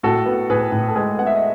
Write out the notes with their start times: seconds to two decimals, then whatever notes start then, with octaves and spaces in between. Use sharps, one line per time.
0.03 A2 F#4 A4
0.26 B3
0.50 A2 G#4 B4
0.72 A2
0.88 A4
0.95 G#3 G#4 B4
1.19 B3 F#5
1.26 E5
1.35 D#5